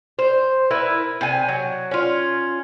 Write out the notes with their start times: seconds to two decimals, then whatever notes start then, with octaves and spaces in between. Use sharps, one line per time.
0.19 C5
0.71 E4 A#4 B4
1.21 C3 G#5
1.48 F#3
1.91 C#4 F4